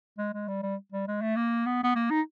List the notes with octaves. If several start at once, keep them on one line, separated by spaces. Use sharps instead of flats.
G#3
G#3
G3
G3
G3
G#3
A3
A#3
B3
B3
A#3
D#4